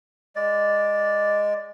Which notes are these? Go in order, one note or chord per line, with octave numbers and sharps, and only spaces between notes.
G#3 D5